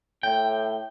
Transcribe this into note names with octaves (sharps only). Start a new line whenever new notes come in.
A2 G5